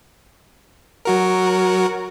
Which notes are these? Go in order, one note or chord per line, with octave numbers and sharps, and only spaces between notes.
F#3 F#4 A#4